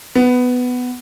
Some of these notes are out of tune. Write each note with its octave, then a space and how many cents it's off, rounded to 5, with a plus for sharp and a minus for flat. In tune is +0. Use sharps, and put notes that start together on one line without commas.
B3 +10